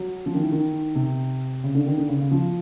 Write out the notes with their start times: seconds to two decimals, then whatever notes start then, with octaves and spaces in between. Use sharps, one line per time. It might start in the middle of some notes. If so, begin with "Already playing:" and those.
Already playing: F#3
0.26 F3
0.34 D#3
0.44 E3
0.52 D#3
0.95 C3
1.64 C#3
1.75 D3
1.86 D#3
1.98 D3
2.09 C#3
2.21 C#3
2.31 F3